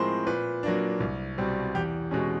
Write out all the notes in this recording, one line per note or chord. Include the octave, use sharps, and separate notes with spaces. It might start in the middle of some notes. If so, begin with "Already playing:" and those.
Already playing: A2 F3 G#3 C4 A#4 C5
A#2 B4
F#3 A#3 D4
C2
B2 G3 C4
E2 G4
B2 G#3 C#4